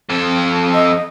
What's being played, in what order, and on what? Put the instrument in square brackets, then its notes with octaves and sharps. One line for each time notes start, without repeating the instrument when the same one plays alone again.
[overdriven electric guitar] F2 A4
[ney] D#5